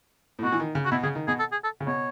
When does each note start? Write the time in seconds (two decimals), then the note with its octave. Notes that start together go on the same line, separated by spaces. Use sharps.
0.39 A2
0.43 B2 F#4
0.52 E3
0.60 D#3
0.75 C#3
0.85 F#4
0.91 B2 E4
1.03 C#3 G#4
1.15 D#3
1.28 B2 G#4
1.39 A4
1.52 G#4
1.64 A4
1.80 C#3
1.87 B2 C#5